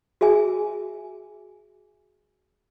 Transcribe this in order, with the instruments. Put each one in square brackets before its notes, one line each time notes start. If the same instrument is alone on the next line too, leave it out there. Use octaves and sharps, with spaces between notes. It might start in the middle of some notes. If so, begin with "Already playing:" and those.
[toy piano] F#4 G#4 E5 G#5